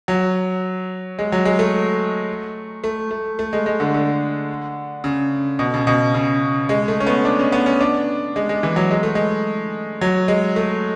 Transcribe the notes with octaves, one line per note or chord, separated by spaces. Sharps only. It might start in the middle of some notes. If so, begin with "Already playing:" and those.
F#3
G#3
F#3
G#3
A3
A3
A3
A3
G#3
G#3
D3
D3
C#3
B2
C#3
B2
C#3
G#3
A3
C#4
B3
D4
C#4
B3
C#4
D4
G#3
G#3
E3
F#3
G#3
A3
G#3
F#3
G#3
A3